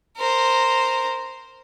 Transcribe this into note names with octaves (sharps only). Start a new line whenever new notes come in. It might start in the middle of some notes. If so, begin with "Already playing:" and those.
A#4 C5